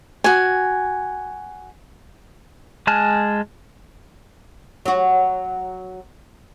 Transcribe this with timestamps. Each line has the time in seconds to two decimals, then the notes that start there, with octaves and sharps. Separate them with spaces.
0.24 F#4 G#5
2.87 G#3 G#5 A5 F6 F#6
4.86 F#3 F#4